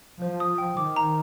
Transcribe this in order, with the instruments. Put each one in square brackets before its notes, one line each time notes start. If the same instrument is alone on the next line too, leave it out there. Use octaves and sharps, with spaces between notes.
[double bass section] F3 [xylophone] C5
[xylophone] D#6
G5
[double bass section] D#3 [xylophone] D6
[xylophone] A#5